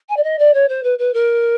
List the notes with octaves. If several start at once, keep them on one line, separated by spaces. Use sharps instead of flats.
G#5
D5
D#5
D5
C#5
C5
B4
B4
A#4